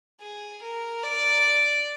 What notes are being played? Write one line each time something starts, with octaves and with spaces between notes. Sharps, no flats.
G#4
A#4
D5